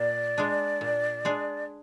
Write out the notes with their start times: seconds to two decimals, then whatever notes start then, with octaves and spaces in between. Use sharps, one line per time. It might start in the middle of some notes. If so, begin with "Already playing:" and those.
Already playing: A#2 D5
0.38 G#3 D4 G#4
0.81 A#2
1.25 G#3 D4 G#4